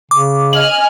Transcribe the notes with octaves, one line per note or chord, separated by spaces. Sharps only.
C#3 D6
D#5 G#5 F6 F#7